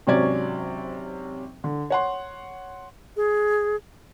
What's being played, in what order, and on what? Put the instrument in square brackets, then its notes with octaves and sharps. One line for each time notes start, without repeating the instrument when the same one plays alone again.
[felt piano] G#1 C3 F#3 C#4 D5 G#6
D3
C#5 F#5 C6
[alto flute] G#4